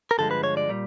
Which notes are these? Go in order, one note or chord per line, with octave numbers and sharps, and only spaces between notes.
A#4
G2 D3 F3 G#3 A4
B4
C#5
D5
A#2 G3